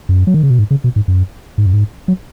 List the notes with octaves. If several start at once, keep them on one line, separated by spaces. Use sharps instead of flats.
F#2
F#3
D#3
C#3
B2
G#2
C#3
B2
G#2
F#2
G#2
F#2
G#2
F#3